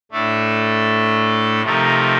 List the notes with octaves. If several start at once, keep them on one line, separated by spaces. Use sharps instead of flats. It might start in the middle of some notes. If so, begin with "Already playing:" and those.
A2 A3 D4 A4
C3 F3 A3 D#4 A#4